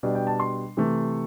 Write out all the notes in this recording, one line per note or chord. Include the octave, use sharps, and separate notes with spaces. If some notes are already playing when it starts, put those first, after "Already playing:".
B2 G3 D4
G5
A5
C6
C3 E3 A3